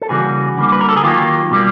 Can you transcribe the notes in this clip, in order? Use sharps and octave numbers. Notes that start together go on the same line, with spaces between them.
A4
C#3 E3 G3 A#3 F#4 G#4
D3 G3 A#3
B4
A#4
A4
G#4
D#3 F#3 A#3 F4 G4
B2 G3 A#3